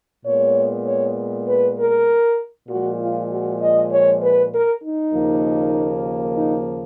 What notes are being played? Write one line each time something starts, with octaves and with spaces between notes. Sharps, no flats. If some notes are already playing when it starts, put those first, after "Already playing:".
A#2 G#3 B3 C#5
C#5
B4
A#4
A#2 F3 G#3 F#4
F4
F#4
D#5
C#5
B4
A#4
D#4
D#2 C#3 F3 A#3
D#4